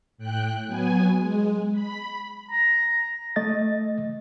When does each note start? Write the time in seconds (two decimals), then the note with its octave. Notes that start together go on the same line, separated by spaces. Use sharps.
0.18 A2 G5 F#6
0.67 F#3 B3 G#5
1.15 G#3
1.73 B5
2.51 A#5
3.36 A3 D#5 A6